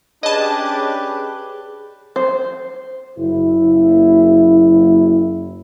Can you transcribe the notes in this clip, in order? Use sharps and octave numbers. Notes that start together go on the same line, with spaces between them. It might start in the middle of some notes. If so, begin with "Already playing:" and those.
C#4 D4 G4 G#4 B4 D#5 A5
C5
F#1 E4